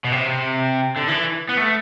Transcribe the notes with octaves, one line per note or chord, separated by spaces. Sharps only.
B2
C3
D3
E3
B3
A3